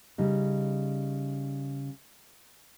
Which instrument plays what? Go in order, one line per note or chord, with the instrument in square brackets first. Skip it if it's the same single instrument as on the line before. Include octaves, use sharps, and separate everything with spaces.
[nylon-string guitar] C#3 G3 D#4